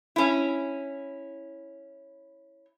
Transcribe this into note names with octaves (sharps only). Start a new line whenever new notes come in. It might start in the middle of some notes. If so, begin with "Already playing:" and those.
C#4 E4